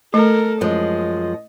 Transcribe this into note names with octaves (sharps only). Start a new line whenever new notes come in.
A3 A4 A#4
F#2 F3 G#3 D#5